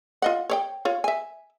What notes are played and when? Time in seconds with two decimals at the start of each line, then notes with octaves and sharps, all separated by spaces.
0.22 F4 D#5 F#5
0.50 C#5 D5 G5
0.85 F4 C#5
1.04 E5 G#5